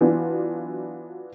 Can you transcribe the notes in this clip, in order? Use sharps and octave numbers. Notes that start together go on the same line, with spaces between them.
E3 F#3 B3 D4 F4